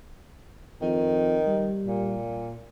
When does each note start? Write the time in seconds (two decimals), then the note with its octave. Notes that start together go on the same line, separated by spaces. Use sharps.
0.82 F2 D#3
1.47 G3
1.87 A#2